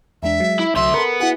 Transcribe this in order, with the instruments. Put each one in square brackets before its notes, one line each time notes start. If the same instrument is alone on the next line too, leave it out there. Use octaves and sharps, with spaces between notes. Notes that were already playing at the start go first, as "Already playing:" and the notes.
[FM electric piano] E2 G#3 D4 [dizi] E5
[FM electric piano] F#3 G#3
[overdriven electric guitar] E4
[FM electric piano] C2 F#3 [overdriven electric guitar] D3 E5 [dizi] C6
[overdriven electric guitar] B3 [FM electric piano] A4 A#4
[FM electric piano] E4 F#4 G#4 [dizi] F#5